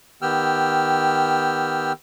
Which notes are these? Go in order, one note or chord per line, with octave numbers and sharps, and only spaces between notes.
D#3 B3 G4 G5 E6 F6